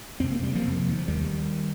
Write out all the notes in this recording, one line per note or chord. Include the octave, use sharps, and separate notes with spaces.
F2 C3 C4
A#3
G3
F3 A#3
F2 C3
D#3
F3
D#2 D#3 G3